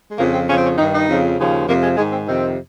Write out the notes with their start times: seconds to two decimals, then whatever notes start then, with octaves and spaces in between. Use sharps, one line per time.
0.09 G#3
0.18 F2 C#3 F3 A#3
0.33 C4
0.48 F2 C#3 F3 C#4
0.57 C4
0.64 C#4
0.78 G2 D#3 D#4
0.93 D#4
1.08 F2 C#3 F3
1.38 D#2 C#3 F3
1.67 F2 C3 F3 A#3
1.82 G#3
1.97 G#2 D#3 G#3
2.12 C4
2.26 F2 C3 D#3 C4